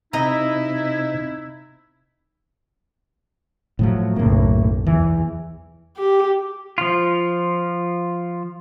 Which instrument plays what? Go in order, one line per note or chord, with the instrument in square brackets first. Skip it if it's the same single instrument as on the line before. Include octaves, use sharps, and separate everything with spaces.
[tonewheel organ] C3 [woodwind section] D#4 E4 [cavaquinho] D#5 A#5
[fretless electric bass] A2 F3 F#3
[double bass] F#1 B1 [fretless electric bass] A2 A#3
[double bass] E2 [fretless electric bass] E3
[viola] G4
[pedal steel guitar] F3 F4